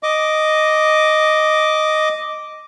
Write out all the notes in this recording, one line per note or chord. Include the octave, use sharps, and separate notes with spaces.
D#5 D6